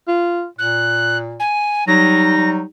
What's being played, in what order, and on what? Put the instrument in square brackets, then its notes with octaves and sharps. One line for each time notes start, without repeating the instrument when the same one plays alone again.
[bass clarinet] F4
[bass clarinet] A#2 [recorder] F#6
[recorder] G#5
[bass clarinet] F#3 [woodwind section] G3 D#4 [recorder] A#6
[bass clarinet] F#3